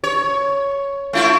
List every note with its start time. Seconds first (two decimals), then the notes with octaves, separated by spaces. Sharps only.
0.04 C#5
1.13 A3 E4 F4